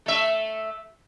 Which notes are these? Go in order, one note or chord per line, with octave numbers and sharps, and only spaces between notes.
A3 E5